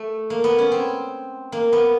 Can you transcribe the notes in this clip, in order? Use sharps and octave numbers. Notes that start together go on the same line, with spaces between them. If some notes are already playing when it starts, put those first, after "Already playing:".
Already playing: A3
A#3
B3
C#4
C4
A#3
B3